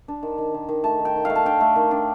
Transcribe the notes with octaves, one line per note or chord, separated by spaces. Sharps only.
D4
D#3
D#3
D#3
D#3
A3 A5
D#3
G5
D#3
A3 F5
A5
D4 G5
A3
D#3
D4